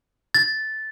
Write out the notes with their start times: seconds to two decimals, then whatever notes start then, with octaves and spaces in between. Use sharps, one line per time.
0.34 A6